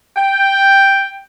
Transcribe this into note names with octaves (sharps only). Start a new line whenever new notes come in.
G5